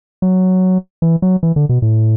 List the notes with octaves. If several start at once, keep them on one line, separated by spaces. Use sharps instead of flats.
F#3
E3
F#3
E3
D3
B2
A2